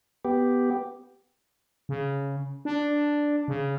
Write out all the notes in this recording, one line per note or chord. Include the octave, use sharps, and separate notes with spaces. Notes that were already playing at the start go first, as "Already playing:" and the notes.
B3 G4
C#3
D4
C#3